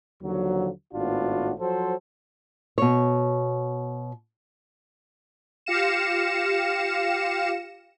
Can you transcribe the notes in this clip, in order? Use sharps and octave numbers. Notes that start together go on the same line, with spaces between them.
D#2 D3 F3 F#3
G#1 A2 B3 D4 F4 F#4
F3 F#3 F#4 A4 C5
B2 C#5
F4 G4 F5 A#6 C#7 E7